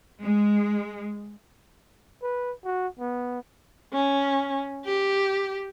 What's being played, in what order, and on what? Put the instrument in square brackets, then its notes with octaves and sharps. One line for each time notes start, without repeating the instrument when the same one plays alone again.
[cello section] G#3
[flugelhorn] B4
F#4
B3
[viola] C#4
G4